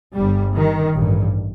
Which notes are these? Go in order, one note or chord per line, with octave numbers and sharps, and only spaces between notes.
G1 G2 G3
D#3
A1 G2